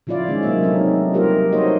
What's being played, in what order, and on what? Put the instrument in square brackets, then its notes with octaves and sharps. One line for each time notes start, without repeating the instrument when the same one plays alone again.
[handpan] C#3 F3 E4 F4 D5 F5
D#3 G#3 C#4
C3 F#3 A#3 E5
F#3 A3 C4 D4 D#4
G3 A#3 F4 G4 A#4
A3 D#4 F#4 C5 C#5 D#5